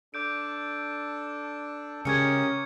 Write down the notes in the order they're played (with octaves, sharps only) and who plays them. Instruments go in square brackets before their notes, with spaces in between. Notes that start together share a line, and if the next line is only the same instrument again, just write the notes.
[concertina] D4 A4 [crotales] D6 G6 D7
[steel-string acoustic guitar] C#3 G#3 [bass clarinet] C#4 [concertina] G4 A#4 D#6 [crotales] G#6 C#7